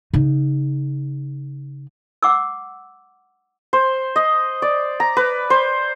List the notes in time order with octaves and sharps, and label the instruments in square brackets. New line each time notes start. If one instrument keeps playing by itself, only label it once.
[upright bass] C#3 D#4
[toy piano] F#5 D6 E6
[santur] C5
D#5
D5
A#5
B4
C5